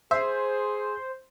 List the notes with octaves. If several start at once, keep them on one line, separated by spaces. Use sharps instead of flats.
G#4 C5 E5